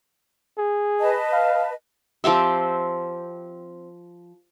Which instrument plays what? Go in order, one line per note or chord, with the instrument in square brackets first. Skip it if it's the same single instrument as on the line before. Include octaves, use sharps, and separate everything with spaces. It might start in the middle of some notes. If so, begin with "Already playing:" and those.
[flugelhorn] G#4
[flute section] B4 D#5 A5
[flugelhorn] F5
[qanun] F3 C4 G4 E5